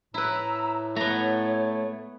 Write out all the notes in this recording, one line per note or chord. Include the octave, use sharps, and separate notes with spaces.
A2 E4 B4 A#5 E6
A3 B3 C#5 A#5